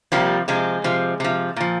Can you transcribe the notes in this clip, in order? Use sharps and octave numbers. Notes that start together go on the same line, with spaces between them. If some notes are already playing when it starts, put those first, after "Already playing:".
C3 F3 G3 A#3
C3 F3 G#3
C3 F3
C3 F3
A#2 F3